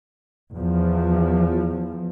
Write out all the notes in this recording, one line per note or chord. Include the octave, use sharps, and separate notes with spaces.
E2 F3